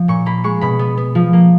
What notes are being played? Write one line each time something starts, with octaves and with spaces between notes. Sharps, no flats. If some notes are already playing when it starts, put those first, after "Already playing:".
Already playing: F3
A#2 C#6
A#3 B5
G#3 C#6
B2 B5
B3
B3
F3
A#3